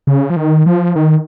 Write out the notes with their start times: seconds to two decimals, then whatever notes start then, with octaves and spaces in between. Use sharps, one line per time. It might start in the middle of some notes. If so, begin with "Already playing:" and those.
0.07 C#3
0.30 F3
0.36 D#3
0.66 F3
0.96 D#3